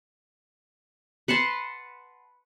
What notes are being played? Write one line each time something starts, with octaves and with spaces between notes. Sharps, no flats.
B4 F#5 A5 C6